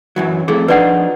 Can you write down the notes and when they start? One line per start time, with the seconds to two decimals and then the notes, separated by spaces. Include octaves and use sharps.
0.16 F#2 E3 F#3
0.48 F2 A3 E4 G#4
0.68 F3 D4 D#4 B4 D5 F#5